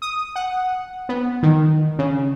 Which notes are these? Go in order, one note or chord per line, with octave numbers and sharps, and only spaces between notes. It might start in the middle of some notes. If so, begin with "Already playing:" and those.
D#6
F#5
B3
D#3
C#3